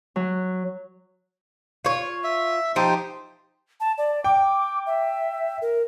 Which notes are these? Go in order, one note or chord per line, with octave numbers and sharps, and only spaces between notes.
F#3
F4 C#5
E5
F3 D#4 G4 C5
A5
D5
G5 D6
E5
A#4